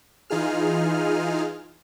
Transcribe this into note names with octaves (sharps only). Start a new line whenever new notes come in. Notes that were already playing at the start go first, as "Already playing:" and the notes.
E3 D#4 F4 G#4 F6